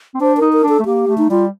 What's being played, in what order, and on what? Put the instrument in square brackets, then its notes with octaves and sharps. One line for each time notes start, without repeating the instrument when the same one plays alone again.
[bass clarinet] C4
[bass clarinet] D4 [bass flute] C5
[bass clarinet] D#4 [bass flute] A#4
[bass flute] A#4
[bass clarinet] D4
[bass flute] A4
[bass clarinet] A3
[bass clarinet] A#3 [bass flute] G4
[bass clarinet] A3
[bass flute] D#4
[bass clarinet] G3 [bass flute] F4